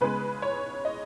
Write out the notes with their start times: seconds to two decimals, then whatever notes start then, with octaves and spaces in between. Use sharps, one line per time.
0.01 C#3 G#3 B3 B4
0.42 C#5
0.85 D#5